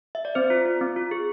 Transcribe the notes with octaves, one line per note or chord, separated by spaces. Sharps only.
E5
D5
C4 C5
F4
F4
C4
F4
G#4